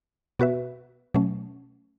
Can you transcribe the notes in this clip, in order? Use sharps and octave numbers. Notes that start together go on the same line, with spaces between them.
B2 B3 F#4 B4 E5
B2 F#3 A3 C#4